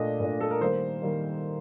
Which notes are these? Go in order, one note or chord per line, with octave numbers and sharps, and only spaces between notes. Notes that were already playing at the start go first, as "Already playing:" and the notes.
Already playing: A#2 A3 D4 D#5
A#2 A3 D4
A4
A#4
D#3 G3 A#3 C5
D#3 G3 A#3